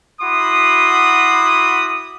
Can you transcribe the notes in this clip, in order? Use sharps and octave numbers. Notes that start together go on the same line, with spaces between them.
E4 F#4 B5 C6 D6 D#6